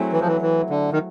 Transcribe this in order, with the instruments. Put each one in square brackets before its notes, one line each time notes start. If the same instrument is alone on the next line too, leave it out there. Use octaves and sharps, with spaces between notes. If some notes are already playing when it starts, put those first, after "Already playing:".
Already playing: [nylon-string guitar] F#3 A3 C4 E4 G#4
[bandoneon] E3
F3
E3
E3
D3
D#3